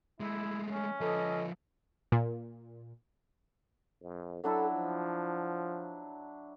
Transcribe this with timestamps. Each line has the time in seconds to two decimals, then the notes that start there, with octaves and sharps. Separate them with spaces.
0.20 G#3 A3 E4
0.66 C#4
1.01 F3 A4 B4 D#5
2.12 A#2
4.02 F2
4.44 F#3 D4 E4 A4
4.73 F3